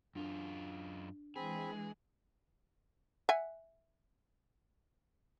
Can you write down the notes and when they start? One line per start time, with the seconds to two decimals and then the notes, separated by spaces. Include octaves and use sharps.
0.15 F#2 D4 F4
1.36 E3 G#3 C4 G#4 B5
3.29 E5 F#5 G#5